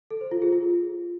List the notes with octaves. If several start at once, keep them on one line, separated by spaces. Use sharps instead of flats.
A4
C5
F4
G#4
F4